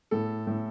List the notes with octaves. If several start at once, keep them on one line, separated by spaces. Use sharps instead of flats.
A2 A4
A2